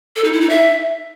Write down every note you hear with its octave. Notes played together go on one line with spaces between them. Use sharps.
A4
D#4
E4
D#4
E5